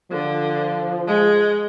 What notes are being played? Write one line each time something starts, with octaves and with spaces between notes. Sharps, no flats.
D3 F3
G#3